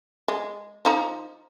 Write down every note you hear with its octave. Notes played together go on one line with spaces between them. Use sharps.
G#3
F3 D#4 A#5